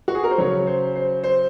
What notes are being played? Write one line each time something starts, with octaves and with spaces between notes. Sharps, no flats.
F#4
G#4
A#4
C5
C#3 F#3 C#5
C5
C5
C5